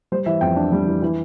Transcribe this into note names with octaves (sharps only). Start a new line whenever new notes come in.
G3 C5
E3 E5
F2 G5
D4
G3
E3
E3